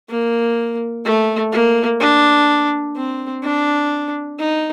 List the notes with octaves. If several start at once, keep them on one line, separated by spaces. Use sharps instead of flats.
A#3
A3
A#3
D4
C4
D4
D#4